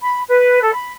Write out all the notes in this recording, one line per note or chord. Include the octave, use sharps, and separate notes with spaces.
B5
B4
A4
B5